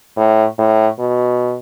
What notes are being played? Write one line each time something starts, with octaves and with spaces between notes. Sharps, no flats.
A2
A2
B2